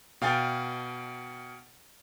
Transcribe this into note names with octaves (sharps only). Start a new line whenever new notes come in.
B2 F5 G5 G#5 A6